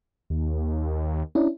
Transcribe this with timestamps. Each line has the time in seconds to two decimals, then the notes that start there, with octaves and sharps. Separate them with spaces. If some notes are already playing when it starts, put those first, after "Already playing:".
0.30 D#2
1.35 C#4 D4 E4